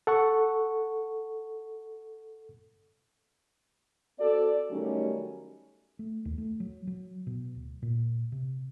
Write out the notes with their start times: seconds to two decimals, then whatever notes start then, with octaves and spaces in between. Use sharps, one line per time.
0.07 A4 F#5 C#6
4.20 C4 F#4 A4 D5
4.70 D#3 F#3 G3 A3 C#4 D#4
5.99 A3
6.25 D#2
6.38 A3
6.60 F#3
6.87 F#3
7.27 B2
7.55 D1
7.82 A#2
8.32 C3